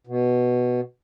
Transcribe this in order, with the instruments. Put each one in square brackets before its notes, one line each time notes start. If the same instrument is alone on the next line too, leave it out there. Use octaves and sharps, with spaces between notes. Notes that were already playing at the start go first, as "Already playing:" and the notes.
[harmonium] B2